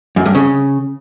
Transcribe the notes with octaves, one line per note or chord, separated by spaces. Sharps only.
F#2
G2
C#3